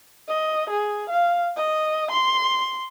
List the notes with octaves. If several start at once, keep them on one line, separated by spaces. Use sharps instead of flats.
D#5
G#4
F5
D#5
C6